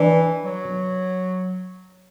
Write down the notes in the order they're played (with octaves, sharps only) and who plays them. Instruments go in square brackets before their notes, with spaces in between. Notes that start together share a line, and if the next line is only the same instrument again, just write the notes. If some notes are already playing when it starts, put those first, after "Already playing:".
Already playing: [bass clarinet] E3 [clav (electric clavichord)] D4
[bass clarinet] F#3